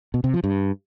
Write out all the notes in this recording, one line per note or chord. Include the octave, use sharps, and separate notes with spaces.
B2
C3
F3
G2